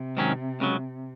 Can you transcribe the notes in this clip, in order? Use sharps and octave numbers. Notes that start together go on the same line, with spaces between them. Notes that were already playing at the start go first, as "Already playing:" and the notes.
Already playing: C3
G#2 D#3 F#3 C#4
C#2 C#3 F#3